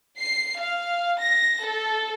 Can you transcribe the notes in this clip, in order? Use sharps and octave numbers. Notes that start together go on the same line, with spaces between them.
C7
F5
A#6
A4